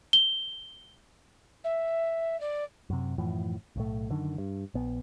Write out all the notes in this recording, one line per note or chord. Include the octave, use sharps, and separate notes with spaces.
G7
E5
D5
F#2 C3
F#2 A2 E3 F3
B1 A2 A3
F#2 D3 D#3
G2
A#1 B3